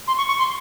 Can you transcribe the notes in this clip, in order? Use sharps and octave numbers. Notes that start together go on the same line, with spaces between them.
C6
C#6
C#6
C6